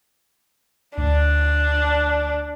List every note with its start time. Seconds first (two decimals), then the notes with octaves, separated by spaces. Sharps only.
0.97 D2 D4